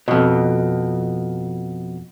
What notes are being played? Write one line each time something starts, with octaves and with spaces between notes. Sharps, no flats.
F2 B2